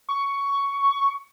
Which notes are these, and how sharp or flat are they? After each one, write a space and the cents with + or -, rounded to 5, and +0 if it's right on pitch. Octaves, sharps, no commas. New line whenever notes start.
C#6 +10